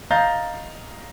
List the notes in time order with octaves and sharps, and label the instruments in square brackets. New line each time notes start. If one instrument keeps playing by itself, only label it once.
[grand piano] D#5 F5 A#5 G6 A6